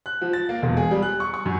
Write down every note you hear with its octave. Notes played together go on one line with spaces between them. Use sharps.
F#6
F3
A6
A#3
E1
G#4
G3
F#6
C#6
C#6
F#2